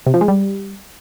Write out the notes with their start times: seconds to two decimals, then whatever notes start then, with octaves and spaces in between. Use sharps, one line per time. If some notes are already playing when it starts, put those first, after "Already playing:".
0.07 C3
0.14 F3
0.21 G#3
0.28 G3